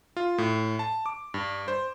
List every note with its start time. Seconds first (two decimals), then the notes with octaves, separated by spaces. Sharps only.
0.17 F4
0.38 A2
0.79 A5
1.06 D6
1.34 G2
1.68 C5